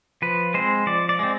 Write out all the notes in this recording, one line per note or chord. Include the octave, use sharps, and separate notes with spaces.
F3 B4
G#3 C4 C5
F3 D5
D5
G#3 C4